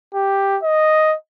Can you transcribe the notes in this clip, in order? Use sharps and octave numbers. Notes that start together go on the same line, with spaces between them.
G4
D#5